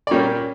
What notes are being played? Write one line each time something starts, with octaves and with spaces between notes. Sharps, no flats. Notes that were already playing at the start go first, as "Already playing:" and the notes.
D5
A#2 G3 A#3 C#4 C#5